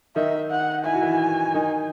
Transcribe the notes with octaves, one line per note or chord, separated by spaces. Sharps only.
D#3 D#4 E5
F#5
E4 G#5
F#4
E3 E4
D#3 D#4